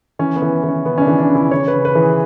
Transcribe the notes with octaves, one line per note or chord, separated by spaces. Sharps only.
E3 C#4
B3
E3
E3
C#4
C#3 B3
C#4
D4
E3
D4
C#3
E4
C#3 C#5
B4
C#3
B4
E3
G#4